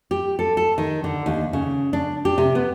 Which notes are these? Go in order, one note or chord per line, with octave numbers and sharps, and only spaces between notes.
G4
A4
A4
D#3
D3
D#2
C#3
D4
G4
C3
B3